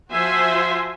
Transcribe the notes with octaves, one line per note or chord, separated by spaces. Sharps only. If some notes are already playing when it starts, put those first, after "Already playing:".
F3 F4 F#4 C5 E5 G#5